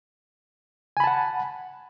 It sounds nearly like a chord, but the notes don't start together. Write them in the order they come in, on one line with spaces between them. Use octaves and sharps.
G#5 B5 A5 F#5